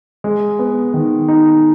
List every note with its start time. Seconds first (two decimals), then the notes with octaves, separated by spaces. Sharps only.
0.24 G#3
0.59 B3
0.94 D#3
1.28 D#4